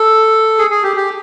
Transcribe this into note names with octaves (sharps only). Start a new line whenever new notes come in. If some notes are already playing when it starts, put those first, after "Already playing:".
Already playing: A4
G#4
G#4
G4
G4